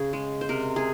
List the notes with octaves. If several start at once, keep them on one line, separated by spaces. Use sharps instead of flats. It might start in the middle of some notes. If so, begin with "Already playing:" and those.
Already playing: C#3 G#4
G#3
C5
C3 A#4
G#4